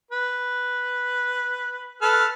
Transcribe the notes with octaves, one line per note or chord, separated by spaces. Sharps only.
B4
A4 B4 F6